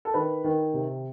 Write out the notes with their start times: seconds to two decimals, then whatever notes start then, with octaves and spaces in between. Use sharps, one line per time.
0.05 A4
0.14 D#3 B4
0.44 D#3
0.74 C3